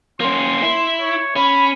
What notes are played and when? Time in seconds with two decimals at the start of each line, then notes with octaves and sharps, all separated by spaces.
0.21 A#3 C#4 C6
0.63 E4
1.01 C#5
1.36 C#4 B5